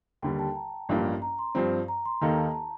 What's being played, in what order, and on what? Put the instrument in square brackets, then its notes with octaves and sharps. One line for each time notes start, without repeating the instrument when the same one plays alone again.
[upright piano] D#2 D3 G3 [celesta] G5
[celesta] A5
A#5
[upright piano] A1 G2 F3 A#3 D4
[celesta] A#5
C6
[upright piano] G2 F3 C4
[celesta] A#5
C6
[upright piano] D#2 D#3 A#3 D#4 A4 [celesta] A#5
[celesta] A5
A5